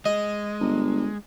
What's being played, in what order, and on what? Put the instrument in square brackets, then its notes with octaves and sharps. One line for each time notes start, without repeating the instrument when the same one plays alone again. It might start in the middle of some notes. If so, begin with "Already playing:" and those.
[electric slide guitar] G#3 [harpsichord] D#5
[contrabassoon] G1